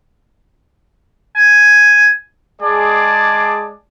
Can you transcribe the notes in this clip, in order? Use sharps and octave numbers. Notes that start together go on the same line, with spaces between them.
G#5
G#3 G#4 D5 G#5 A5 D6